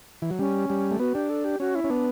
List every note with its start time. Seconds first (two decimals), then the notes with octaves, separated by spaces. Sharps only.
0.22 E3
0.30 F#3
0.39 G3 C#4
0.70 G3
0.91 A3
0.99 B3 F#4
1.14 D4 G4
1.29 A4
1.45 G4
1.60 C#4 F#4
1.75 E4
1.84 C#4
1.90 B3 D4